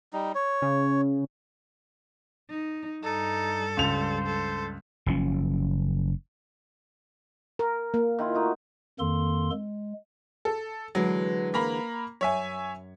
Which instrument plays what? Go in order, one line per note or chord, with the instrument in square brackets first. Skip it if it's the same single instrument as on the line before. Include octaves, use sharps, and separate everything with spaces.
[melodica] G3 D#4
C#5
[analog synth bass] C#3
[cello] D#4
[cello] G2 G3 [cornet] D#4 [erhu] A4
[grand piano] C#2 F7 [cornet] C5
[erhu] A4
[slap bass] F#1 F3 C#4
[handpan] A#4
A#3
[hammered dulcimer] D#3 E4 F4
A3 D#4 F#4
[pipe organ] F2 D#3 A#3 A4 C6
G#3
[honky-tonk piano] A4
[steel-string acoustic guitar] D3 E3 G#3 [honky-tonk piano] F#3
[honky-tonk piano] A#3 A#5 B5
[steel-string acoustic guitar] F#2 [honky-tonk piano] C#5 E5 G#5